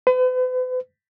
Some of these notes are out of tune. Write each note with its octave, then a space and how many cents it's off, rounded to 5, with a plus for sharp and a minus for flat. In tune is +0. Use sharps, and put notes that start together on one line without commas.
B4 +45